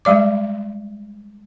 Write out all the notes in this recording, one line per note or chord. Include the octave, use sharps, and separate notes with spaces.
G3 G#3 D5 D6